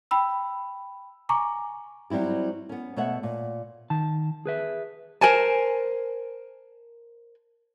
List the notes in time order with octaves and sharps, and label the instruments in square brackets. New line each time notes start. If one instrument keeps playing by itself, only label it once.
[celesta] G5 B5 E6
G#5 A#5 C#6 D6
[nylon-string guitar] F#3 G3 C4 E4 G4
B3 C#4
B2 A3 C#5 E5 F#5
A#2
[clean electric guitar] D#3 A5
G#4 B4 E5
[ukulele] A#4 C5 G#5 A5